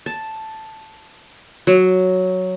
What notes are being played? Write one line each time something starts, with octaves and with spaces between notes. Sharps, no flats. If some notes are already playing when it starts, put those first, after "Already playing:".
A5
F#3